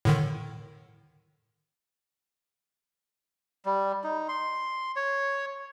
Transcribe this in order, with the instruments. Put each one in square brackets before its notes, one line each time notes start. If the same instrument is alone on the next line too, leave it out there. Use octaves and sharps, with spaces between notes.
[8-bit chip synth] A2 D3 D#3
[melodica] G3
D#4
C6
C#5